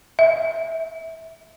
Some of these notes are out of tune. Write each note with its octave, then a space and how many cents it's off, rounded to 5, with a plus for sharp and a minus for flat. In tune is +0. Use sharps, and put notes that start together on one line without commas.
E5 -20